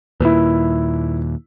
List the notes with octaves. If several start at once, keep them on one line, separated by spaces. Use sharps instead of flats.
D#2 A#2 E4 B4